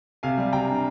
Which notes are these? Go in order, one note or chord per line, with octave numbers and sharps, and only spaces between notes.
C3 F5 G#5
G3
C3 G5 A#5
D4